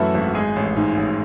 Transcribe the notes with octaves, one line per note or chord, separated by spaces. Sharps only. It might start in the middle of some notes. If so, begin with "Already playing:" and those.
Already playing: F#2 E3 A3 E4 F#4 B4 E5 B5
G#1
G#3 G#4 G#5
A1
G#2
A1